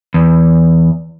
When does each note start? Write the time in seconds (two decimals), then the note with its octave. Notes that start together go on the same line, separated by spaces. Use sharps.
0.14 E2